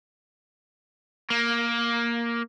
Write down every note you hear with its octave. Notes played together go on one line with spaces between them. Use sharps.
A#3